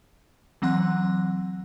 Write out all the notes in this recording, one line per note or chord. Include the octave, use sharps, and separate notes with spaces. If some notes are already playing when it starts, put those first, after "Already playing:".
E3 F#3 C4 F#5 C6 F#6